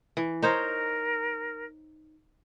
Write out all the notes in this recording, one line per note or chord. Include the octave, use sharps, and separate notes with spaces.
E3
D#4 A#4 C5 C#5